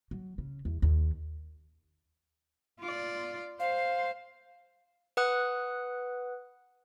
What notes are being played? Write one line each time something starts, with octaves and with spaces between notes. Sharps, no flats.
F#3
C#3
E2
D#2
F4 D5
C5 F5
B4 F#5 D#6 F#6